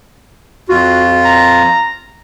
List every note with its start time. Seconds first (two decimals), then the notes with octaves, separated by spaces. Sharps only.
0.69 F2 F4 F#4
1.25 A#5